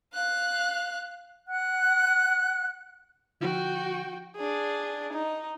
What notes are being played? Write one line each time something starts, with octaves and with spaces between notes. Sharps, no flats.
F5 F#6
F#5 F#6
D3 F3 F#4 G5
D4 G#4
D#4